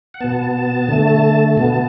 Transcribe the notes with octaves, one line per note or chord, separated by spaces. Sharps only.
F#5
B2 B3 A5
D3 A3
B2 B3 A5